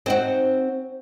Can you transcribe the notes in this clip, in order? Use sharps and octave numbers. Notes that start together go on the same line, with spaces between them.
C4 D#4 F#4